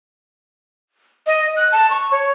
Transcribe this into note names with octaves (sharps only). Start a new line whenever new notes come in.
D#5
F#6
A5
C#6
C#5